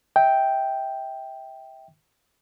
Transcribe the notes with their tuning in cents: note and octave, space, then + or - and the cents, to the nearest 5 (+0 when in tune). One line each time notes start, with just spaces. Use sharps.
E5 -30 G5 +0